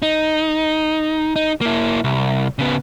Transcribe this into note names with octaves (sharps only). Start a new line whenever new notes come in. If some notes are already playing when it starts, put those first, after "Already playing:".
D#4
D#4
A#3 E4
C2
C#3 B3